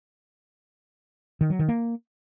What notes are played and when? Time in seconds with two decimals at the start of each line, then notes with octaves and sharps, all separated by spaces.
1.41 D#3
1.50 F#3
1.59 D#3
1.69 A#3